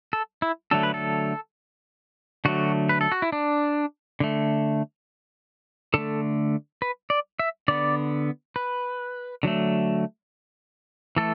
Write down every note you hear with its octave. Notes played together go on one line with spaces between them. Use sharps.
A4
E4
D3 F#3 A3 A4
B4
A4
D3 F#3 A3 F#4
B4
A4
F#4
E4
D4
D3 A3
D3 A3 A4
B4
D5
E5
D3 B3 D5
B4
D3 F#3 A3
E3 A3 A4